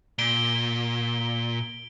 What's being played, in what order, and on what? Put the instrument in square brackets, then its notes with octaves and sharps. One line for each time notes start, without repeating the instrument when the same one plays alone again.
[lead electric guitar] A#2 [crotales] D7 G7